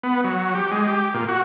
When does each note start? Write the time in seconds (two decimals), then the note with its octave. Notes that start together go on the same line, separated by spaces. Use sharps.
0.03 B3
0.24 F#3
0.55 G4
0.71 G#3
0.87 G4
1.14 A#2
1.29 F#4